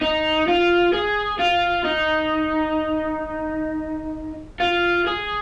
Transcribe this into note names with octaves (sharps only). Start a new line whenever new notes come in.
D#4
F4
G#4
F4
D#4
F4
G#4